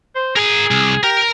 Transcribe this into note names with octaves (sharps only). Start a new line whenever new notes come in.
C5
G#4 A#4 G#5
C2
G4 A#4